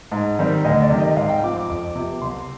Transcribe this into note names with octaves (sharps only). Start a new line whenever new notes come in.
G#2
D#3 G3 C4
D2 D#5
D5
C3 D#3 G3
D#5
G#2 F5
G5
F3 C4 D6
D6
F2 D6
C3 F3 B3
C2 C6